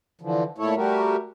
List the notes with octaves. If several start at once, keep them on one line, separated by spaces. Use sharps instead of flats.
D3 E3 F3
A#2 A3 E4 A4 C#5
G3 A3 F#4 G4 A#4